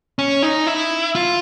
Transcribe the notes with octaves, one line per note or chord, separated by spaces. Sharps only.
C#4
D#4
E4
F4